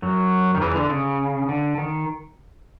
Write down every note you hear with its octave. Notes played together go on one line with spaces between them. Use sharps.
F#2 F#3
D#3
E2 E3
D3
C#3
D3
D#3